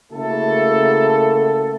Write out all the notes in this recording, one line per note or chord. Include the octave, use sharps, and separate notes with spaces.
C#3 A3 A#3 E4 F#4 A4